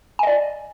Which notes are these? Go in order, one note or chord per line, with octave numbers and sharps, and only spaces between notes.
D5 D#5 G#5